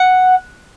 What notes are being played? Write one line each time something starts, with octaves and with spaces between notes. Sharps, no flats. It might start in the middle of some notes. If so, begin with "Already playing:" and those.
Already playing: F#5